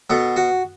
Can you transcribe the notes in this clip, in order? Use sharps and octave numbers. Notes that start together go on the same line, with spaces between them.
B2 B3 A4
F#4